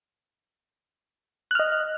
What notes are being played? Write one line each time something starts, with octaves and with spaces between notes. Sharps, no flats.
D#5 F6 F#6